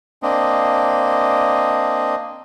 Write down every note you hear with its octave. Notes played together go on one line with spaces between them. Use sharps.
A#3 C4 D4 D#5